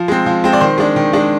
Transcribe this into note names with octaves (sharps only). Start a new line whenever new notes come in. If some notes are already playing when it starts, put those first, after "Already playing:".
Already playing: F3
G#3 C4
F3
G#3 C4
D5
D#3 C5
G#3 D4
D#3
G#3 D4